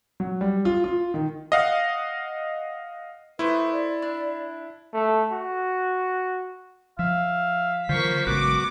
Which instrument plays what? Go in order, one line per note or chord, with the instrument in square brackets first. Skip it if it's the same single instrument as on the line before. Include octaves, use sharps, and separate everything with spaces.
[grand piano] F#3
G3
F4
F4
D#3
[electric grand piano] D#5 F5 F#5
[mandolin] A3 C5 D#5 [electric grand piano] E4 [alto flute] B4
[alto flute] D5
[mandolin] D4
[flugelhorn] A3
F#4
[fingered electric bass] F3 [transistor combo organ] E5 [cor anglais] F5
[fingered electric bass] D3 E3 F#3 [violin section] A#3 C#6 B6 [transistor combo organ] F4 C5
[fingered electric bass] A1 C#3 G#3 [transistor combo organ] F#3 B3 F#4 [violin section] D6